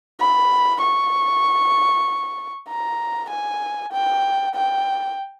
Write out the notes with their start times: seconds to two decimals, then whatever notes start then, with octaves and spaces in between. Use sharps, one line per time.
0.20 B5
0.82 C#6
2.69 A#5
3.30 G#5
3.93 G5
4.55 G5